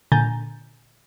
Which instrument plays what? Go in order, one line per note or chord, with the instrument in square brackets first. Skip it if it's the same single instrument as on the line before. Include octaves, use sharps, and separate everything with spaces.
[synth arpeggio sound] A#2 D3 G#5 A#5 G6 A6